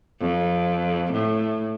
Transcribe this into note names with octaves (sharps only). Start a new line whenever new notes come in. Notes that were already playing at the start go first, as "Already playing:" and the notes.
F2
A2